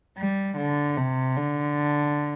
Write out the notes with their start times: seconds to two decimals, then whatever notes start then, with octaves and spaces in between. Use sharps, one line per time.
0.18 G3
0.57 D3
0.97 C3
1.37 D3